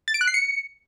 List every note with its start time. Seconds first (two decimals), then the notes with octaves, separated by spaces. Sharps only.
0.08 A6
0.14 D7
0.21 F#6
0.27 C7
0.34 C#7